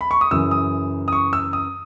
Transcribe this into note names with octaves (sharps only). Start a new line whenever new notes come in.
B5
C#6
D#6
F#2 C#3 E3 E6
D#6
D#6
C#6
E6
D#6